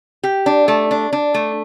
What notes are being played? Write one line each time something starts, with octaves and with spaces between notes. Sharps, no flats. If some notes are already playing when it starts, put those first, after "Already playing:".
G4
D4
A3
D4
D4
A3